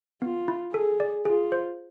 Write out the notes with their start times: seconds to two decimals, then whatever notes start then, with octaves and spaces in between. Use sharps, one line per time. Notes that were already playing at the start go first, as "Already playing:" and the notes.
0.22 B3 F4
0.48 E4
0.73 G#4 A4
1.00 D5
1.25 F4 G#4
1.52 C5